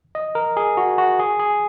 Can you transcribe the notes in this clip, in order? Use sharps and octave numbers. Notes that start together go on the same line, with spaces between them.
D#5
A#4
G#4
F#4
F#4
G#4
G#4